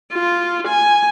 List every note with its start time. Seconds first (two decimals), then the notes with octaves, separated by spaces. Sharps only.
0.13 F4
0.68 G#5